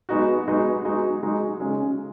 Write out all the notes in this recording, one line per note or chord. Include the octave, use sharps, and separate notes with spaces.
G#3 B3 D#4 F#4
G#3 B3 D#4 F#4
G#3 D#4 F#4
G#3 D#4 F#4
C#3 G#3 C#4